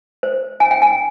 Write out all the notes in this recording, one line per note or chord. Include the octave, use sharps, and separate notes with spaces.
C5
C#4 G#5
G5
G#5